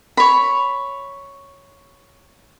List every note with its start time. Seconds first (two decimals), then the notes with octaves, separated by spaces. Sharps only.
0.17 C#5 B5